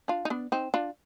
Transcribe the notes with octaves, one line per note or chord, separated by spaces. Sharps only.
D4 F4
D#4
B3 D4
C4 D#4
D4 F4